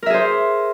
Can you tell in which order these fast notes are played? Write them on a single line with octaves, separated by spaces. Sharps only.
A#4 E5 G#4 C5